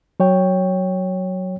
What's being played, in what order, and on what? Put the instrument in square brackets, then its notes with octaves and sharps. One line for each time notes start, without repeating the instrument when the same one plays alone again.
[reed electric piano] F#3 C#5 G5